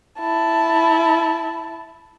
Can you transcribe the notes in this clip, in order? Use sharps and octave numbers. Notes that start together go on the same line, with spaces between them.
E4 A5